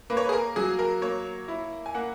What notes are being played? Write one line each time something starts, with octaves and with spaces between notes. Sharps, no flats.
A#3 B4
C#5
B4
G#4
A#4
F#3 G#4
A#4
A#3 C#5
E4
G#5
A#3 F#5